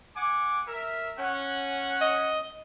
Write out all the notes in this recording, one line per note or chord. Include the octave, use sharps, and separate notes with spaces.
F#5 G#5 D6
A#4 E5
C#4 F#5
D#5